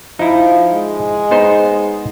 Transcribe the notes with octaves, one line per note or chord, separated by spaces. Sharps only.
F3 D#4 E4
G#3
B3 D#4 C5